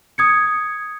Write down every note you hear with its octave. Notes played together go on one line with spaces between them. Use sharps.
D#6 G#6 C#7